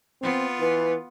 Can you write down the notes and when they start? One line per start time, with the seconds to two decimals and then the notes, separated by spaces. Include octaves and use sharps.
0.21 B3 C4 F4
0.60 E3 B4